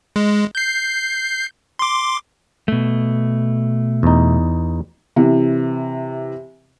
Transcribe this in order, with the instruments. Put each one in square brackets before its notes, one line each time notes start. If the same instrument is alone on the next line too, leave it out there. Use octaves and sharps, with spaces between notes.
[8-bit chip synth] G#3
G6 C7
C6 D6
[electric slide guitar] B2 A3
[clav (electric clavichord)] E2 D#4
[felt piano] C3 E3